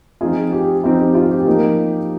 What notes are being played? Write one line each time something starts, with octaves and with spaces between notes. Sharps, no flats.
F3 C4 D#4 F4 G#4
G4
F3 C4 D#4 F4
G4
F4
G4
F3 A#3 D#4